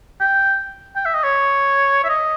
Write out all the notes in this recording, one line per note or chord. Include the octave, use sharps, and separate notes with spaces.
G5
G5
E5
D#5
C#5
E5
D#5